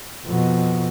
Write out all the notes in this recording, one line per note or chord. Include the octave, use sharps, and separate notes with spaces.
F2 B2